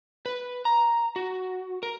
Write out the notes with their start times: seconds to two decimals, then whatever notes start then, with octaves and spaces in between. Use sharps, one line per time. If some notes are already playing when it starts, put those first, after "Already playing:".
0.26 B4
0.65 A#5
1.16 F#4
1.83 A#4